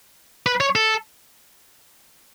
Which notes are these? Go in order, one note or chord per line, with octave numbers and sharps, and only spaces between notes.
B4
C#5
A4